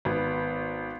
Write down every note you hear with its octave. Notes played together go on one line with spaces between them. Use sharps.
G#1 B3